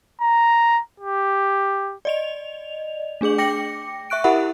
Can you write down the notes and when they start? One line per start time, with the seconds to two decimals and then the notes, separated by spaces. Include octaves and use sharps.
0.22 A#5
1.00 G4
2.05 D5 D#5 F7
3.21 A3 D4 G#4 D6 F#7
3.38 G5 D6 A#6 C#7
4.10 E5 C#6 F#6 D7
4.24 E4 G4 A#4 E5 F#5 B5